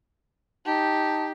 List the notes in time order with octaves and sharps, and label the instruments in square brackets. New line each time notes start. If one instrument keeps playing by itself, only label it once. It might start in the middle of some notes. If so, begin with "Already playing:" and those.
[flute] D#4 [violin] G4 [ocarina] A5